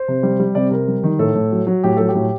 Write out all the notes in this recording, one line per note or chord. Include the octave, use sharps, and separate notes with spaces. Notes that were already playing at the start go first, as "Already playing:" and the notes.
Already playing: C5
C3
G3
G3
C3 D5
C3 A#4
G3
D#3
A2 A4
A2
F#3
F#3
A2 G4
F#3 A4
G4
A2